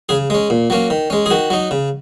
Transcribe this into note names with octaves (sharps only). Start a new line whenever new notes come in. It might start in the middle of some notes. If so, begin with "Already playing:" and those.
C#3 G#4
G#3 C#4
A#2
F#3 A#3 C#4
D#3
G#3 C#4
G#4
D#3 F#4
F#3 D#4
C#3